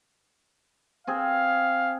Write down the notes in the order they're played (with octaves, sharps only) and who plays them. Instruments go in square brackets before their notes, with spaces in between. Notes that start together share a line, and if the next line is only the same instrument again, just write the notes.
[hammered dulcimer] C4 G#4 [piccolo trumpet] F5